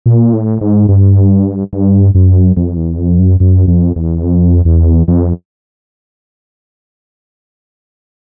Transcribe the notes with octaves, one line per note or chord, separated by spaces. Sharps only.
A#2
A2
G#2
G2
G2
F#2
F2
E2
F2
F#2
F#2
F2
E2
F2
E2
F2